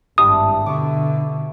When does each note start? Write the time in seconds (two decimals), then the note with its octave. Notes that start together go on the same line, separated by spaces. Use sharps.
0.18 G#1 G2 D4 E4 G4 D#6
0.66 B2 D3 E5 C#6 D6